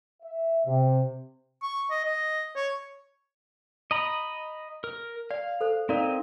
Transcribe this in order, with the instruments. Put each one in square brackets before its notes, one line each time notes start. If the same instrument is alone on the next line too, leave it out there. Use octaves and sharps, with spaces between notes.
[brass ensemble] E5
C3
[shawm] C#6
D#5
D#5
C#5
[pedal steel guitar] D#5 A#5 B5
A#4
[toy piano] D5 [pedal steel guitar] F5
[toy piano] A4 C5
[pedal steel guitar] C4 D#4 [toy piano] A#4 D5 F5